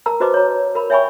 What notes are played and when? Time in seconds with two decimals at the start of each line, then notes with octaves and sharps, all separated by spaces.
0.06 A#4 A5 A#5 E6
0.20 F#4 B4 C5 D#5 A5 D6
0.34 C#5 A#5
0.75 A#4 B5
0.90 C#5 E5 G5 G#5 B5 C#6